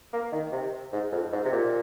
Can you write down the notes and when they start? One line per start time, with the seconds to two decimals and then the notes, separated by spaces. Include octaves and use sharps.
0.13 A#3
0.32 D#3
0.52 C3
0.93 G#2
1.12 F2
1.33 G#2
1.45 C3
1.53 A#2